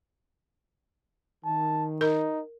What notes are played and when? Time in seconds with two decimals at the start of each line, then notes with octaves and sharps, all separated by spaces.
1.45 D#3 A5
2.01 D#4 A#4